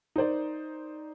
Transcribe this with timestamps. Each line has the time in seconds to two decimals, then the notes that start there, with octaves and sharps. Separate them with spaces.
0.16 D#4 A#4 C5 D5